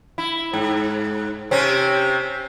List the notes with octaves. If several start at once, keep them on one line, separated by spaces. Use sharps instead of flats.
E4
G#2
C3 C4 C#4